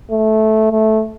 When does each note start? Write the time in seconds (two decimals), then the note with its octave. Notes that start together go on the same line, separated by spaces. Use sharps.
0.11 A3
0.72 A3